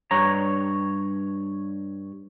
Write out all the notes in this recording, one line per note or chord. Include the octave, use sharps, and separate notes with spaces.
G2 C#5 A#5